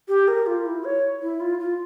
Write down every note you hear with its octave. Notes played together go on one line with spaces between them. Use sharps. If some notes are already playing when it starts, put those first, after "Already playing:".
G4
A#4
F4
E4
C#5
E4
F4
F4